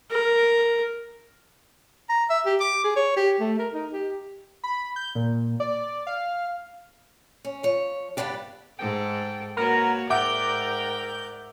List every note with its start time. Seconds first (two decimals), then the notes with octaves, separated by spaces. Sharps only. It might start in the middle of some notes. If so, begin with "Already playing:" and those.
0.11 A#4
2.09 A#5
2.30 E5
2.46 G4
2.61 D6
2.84 G#4
2.96 C#5
3.17 G4
3.40 A3
3.59 A#4
3.74 D#4
3.93 G4
4.64 B5
4.96 G6
5.15 A#2
5.60 D5
6.07 F5
7.45 C#4
7.63 F3 C#5
8.17 G2 G3 B3 D4 G4
8.79 G#2 G#3 A4 G5
9.57 A#3 B3 F#4 A#4 C#5
10.10 G#2 A#4 D5 E5 F#5 G5 D6 G6